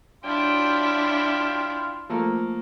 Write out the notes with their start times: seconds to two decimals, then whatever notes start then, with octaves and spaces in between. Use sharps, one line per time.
0.24 F#3 D4 E4 F4 G5
2.09 F3 A3 A#3